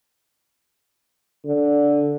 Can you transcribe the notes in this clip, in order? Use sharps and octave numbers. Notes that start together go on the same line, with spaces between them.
D3